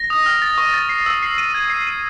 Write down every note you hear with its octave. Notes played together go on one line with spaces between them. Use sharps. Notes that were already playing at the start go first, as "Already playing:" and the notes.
Already playing: A#6
D#6
F6
A6
C#6
A6
C7
E6
C7
D#7
G#6
C7
D#7